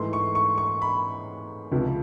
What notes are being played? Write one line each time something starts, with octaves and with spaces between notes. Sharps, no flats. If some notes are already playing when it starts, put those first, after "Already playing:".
Already playing: G#2 E3 A3 C6
C#6
C#6
C#6
B5
C#2 C3 F3